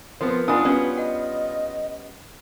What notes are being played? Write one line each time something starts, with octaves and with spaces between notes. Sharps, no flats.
F3 B3 C4 A#4
B3 D4 D#4 F4 G#5 B5 D#6
G3 B3 C#4 F#4 B4 D5
D#5 F#5